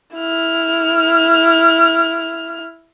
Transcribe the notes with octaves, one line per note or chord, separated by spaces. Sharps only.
E4 F6